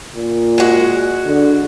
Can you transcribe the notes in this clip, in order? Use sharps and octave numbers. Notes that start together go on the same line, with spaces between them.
A#2
G#3 F#4
D3